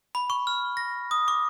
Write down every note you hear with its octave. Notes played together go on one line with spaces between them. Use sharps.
B5
C#6
F6
A#6
D#6
D6